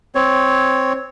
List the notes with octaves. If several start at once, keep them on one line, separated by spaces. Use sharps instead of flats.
C4 C#5